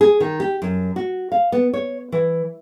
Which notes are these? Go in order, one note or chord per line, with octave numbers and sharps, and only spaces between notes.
G#4
D#3
G4
F#2
F#4
F5
B3
C#5
E3